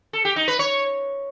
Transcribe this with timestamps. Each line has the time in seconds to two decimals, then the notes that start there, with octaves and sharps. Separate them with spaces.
0.13 A4
0.25 G4
0.36 D#4
0.48 B4
0.59 C#5